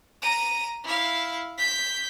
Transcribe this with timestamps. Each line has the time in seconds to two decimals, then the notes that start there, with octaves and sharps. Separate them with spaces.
0.22 A#5 D#7
0.84 E4 F5
1.58 G6 B6